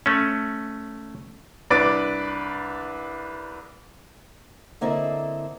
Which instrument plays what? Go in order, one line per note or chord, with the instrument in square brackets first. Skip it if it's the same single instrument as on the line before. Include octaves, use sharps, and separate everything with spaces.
[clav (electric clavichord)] A3 C#4
[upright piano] C2 D4 B4 D6 A6 D7
[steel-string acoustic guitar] D3 A#3 C4 E4 A4 D#5